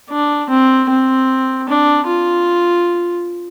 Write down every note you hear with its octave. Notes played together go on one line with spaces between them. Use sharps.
D4
C4
C4
D4
F4